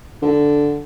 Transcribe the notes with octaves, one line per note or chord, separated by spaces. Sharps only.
D3